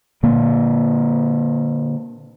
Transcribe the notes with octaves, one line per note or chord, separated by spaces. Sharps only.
A#2 D3 A#3